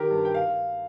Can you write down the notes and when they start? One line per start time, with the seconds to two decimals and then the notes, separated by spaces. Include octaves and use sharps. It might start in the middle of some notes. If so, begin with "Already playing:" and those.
Already playing: D#3 G4 A#4
0.10 G2
0.25 G5
0.34 F5